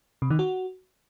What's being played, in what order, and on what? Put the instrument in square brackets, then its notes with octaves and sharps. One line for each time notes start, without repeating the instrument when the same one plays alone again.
[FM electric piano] C3
D#3
F#4